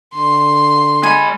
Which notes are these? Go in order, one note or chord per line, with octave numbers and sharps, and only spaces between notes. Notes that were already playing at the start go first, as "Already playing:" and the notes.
D3 C6
G#3 G#5 B5